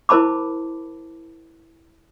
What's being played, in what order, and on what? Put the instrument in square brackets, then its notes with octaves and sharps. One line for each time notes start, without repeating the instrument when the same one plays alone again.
[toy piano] E4 A#4 C5 A5 B5 D6